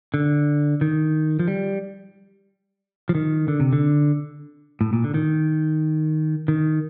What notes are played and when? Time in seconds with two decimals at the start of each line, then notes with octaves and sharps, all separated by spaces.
0.14 D3
0.81 D#3
1.39 F3
1.48 G3
3.09 F3
3.15 D#3
3.48 D3
3.60 C3
3.73 D3
4.81 A2
4.93 A#2
5.04 D3
5.14 D#3
6.48 D#3